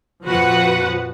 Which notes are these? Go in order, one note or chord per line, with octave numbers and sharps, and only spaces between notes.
F2 A#2 F3 F#4 B4 F#5